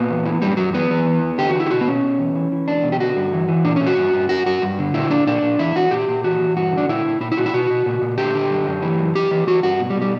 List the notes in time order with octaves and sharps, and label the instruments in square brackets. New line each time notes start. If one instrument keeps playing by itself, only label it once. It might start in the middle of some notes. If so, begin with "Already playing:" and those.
Already playing: [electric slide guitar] A#2 B3
E2
E3
F#2 G3
F#2 F#3
E3 B3
E3
E2
E2
D3 G4
F#4
D3 E4
G4
B2 F#4
B3
B2 C#4
B2
E2
E3
E3
E2 D4
B2
G4
D3 F#4
G2
E3
E3
A#2 D4
A#2 C#4
F#4
G2
G2
F#2 F#4
F#2 F#4
G2
D3
A#2 E4
A#2 D4
A#2 D4
A#2
E2 E4
E2 F#4
A#2 G4
A#2
E3 F#4
E3
G2 F#4
D3
D4
A#2 E4
A#2
A#2 E4
E4
A#2 F#4
E4
B2 F#4
B2
A#2
A#2
D3 G4
D3
F#2
F#2
E3
F#2
E3 G4
E3
E3 F#4
G2 F#4
B2
G3
B2
G3